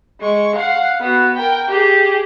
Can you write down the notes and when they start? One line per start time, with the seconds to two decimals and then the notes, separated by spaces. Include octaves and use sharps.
0.20 G#3 C#6
0.56 F5 F#5
1.01 B3 F#4
1.35 A#4 G5
1.68 G4 G#4